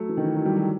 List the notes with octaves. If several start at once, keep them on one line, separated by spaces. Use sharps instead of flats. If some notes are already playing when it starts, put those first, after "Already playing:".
Already playing: F#3 A3
E3
D#3
E3
F#3
G3
F#3